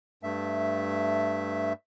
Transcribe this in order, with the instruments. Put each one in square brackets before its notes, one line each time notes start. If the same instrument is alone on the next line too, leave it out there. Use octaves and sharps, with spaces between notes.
[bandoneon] G2 A3 E5